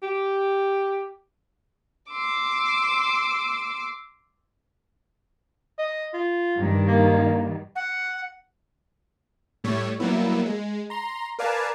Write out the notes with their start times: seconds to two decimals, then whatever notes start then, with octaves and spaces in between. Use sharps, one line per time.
0.03 G4
2.12 C6 D6 E6
5.79 D#5
6.14 F4
6.55 G2 D#3 G3
6.87 A#3
7.76 F#5
9.64 A2 G3 A3 C#5
10.00 F#3 G3 A#3 B3 E4
10.46 G#3
10.90 A#5 C6
11.39 A#4 B4 D5 F5 G#5 A5